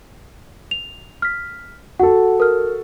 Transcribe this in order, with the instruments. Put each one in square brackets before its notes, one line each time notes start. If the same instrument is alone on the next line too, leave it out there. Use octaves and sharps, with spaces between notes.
[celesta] F7
F6 B6
[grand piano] F#4 A4 [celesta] F#5
[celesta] A#4 F6